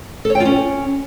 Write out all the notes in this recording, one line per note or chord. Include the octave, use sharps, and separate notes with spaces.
A4
C#5
G5
F4
C#4